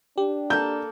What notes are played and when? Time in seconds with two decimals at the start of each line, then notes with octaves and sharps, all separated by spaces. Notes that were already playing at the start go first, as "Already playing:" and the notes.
0.18 D4 G4
0.50 A#3 A4 G6